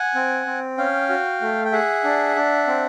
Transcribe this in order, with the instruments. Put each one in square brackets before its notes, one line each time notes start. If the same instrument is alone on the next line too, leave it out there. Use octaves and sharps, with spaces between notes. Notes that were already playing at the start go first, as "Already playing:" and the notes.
Already playing: [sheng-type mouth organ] F#5 G#5
C4
C4
C#4 F5 G5
F#4
A3
G5
G#4 E5 F#5
D4
D4
C4